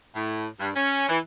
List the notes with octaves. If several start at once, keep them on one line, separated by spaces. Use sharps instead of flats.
A2
G2
C#4
E3